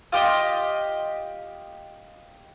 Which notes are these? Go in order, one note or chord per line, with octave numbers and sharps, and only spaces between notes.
F4 G4 D#5